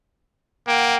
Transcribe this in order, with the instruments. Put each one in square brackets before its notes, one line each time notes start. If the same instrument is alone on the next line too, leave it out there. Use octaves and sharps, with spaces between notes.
[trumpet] A#3 [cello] F#5 G5